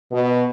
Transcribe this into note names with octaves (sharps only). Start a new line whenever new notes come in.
B2